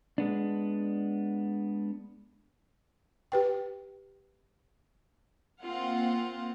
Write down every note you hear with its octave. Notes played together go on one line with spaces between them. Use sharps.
G#3 B3 D4
G4 B4 G5
A#3 C4 F4 F5 F#5